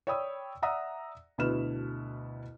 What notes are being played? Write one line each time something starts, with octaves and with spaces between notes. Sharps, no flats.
C#5 D5 G5 B5 D#6 E6
D5 E5 F#5 A#5 D#6 E6
D2 B2 E4 B4 F6 E7